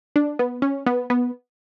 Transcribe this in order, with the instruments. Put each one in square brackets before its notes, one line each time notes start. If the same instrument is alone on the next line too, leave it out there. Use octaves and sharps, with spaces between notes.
[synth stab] D4
B3
C#4
B3
B3